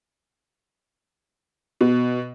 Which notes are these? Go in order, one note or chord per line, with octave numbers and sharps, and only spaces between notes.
B2